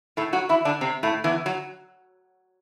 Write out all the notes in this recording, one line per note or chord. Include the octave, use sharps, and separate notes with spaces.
A2 A3
F#3 F#4
E3 E4
D3 D4
C3 C4
A2 A3
E2 E3
F#3